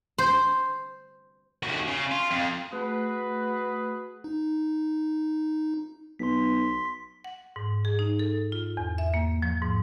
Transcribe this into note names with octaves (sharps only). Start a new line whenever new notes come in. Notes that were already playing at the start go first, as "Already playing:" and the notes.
C5
D#2 F#4
C#3
F4
F2
A3 F#4 G#4 B4
D#4
B1 C6 B6
F#5
G#2
G#4
D#4
A4
F4
E2
E5
A#3
F3
G#2